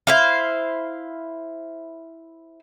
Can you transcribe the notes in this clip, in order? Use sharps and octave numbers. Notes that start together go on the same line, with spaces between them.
E4 C5 F5